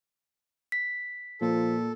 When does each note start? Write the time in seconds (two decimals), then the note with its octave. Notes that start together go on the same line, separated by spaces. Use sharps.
0.72 B6
1.41 A#2 F3 A4